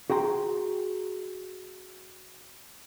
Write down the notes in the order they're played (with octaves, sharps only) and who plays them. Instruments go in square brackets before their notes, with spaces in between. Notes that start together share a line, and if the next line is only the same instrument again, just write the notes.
[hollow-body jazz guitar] F#4 G#4 G5 A#5 C6